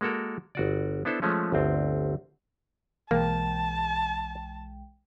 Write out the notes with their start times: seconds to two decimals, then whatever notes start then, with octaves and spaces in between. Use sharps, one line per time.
0.01 G#3 A#3 F#4 A4 A#4
0.55 G1 F#4 D5
1.05 B3 D4 E4 A4 C5
1.22 F3 G#3 A3 C#4
1.52 G1 D2 C4
3.11 B1 E3 G#3 A#3 G5 A5